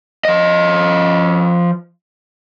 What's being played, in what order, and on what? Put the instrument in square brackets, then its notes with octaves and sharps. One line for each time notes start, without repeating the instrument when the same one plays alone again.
[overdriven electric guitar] F3 D#5